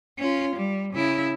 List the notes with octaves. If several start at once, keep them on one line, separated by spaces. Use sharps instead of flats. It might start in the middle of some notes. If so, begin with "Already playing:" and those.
C#4 F4
G3
C#3 E4